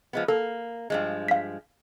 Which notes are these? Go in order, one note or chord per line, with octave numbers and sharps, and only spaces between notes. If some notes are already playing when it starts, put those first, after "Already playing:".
F3 G#3 B3
A#3 A4
G2 F3 G#3
F5 B6